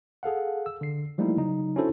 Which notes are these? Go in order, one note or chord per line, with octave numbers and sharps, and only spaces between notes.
G#4 A4 F5 F#5
E6
D3 C7
F3 G3 A3 A#3 D#4 E4
C#3 F#3 D#4
C#4 D4 E4 F#4 A4 C5